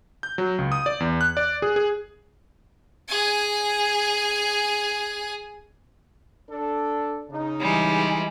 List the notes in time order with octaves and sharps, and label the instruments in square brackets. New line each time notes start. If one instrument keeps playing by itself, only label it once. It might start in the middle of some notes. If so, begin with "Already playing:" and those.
[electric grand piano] G6
F#3
C#2
D#6
D5
E2
F#6
D5
G#4
G#4
[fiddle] G#4 G#5
[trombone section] D4 A4
C#3 D#4
[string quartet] E3 G3 G#3